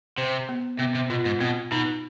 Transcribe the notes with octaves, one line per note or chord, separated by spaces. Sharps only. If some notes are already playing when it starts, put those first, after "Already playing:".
C3 C5
B3
C3 B3
C3
B2 F4
G#2
B2 C4
B2 D#4